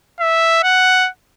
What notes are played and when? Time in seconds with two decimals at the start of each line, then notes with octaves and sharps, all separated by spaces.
0.20 E5
0.63 F#5